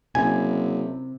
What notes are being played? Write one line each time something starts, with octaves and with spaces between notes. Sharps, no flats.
F#1 C3 G#5